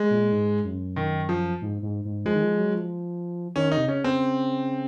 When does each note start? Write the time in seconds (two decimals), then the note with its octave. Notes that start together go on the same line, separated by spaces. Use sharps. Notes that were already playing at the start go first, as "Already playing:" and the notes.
Already playing: G#3
0.10 A#2
0.32 G#2
0.64 F#2
0.96 D#3
1.29 F3
1.61 G#2
1.82 G#2
2.05 G#2
2.25 F3 G#3
2.34 D#3
2.43 F3
2.59 F#3
2.75 F3
3.56 D#3 C#4
3.72 D#4
3.77 C3
3.88 C#3 C#4
4.04 C4